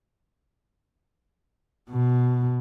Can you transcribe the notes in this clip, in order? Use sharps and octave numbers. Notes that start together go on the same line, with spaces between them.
B2